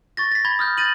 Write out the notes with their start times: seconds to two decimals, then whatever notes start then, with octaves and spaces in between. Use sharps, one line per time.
0.17 C#6 A6 A#6
0.32 A#6 B6
0.45 B5 G#6 A#6 G7
0.59 D#6 F6 G6
0.78 G6 A6 A#6 D#7 F#7